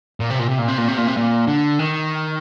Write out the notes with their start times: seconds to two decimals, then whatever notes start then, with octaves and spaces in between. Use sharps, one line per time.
0.20 A#2
0.30 C3
0.39 A#2
0.49 C3
0.59 A#2
0.68 C3
0.78 A#2
0.88 C3
0.98 A#2
1.07 C3
1.17 A#2
1.48 D3
1.79 D#3